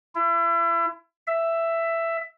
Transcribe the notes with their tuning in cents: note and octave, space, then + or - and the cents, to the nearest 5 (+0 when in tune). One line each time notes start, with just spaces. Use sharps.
E4 +35
E5 +10